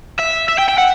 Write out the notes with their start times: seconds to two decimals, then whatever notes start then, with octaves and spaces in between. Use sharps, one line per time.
0.19 E5
0.49 E5
0.59 G5
0.69 G5
0.78 F#5